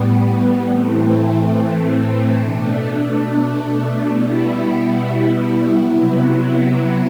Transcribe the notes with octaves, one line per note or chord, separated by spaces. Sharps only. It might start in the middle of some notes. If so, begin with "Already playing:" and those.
Already playing: A2 G3 B3
A2 E3 A3 C4
B2 A3 D4
B2 G3 B3 E4
C3 F#3 B3 E4